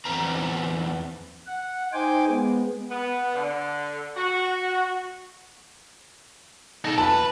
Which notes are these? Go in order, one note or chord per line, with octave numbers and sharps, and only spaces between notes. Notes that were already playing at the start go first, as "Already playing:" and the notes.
E2 C4 B4 A#5
F#5
D#4 C5 G5 G#5 D6
G#3 B3
B3
D3
F#4
D#4 A4
B4 A5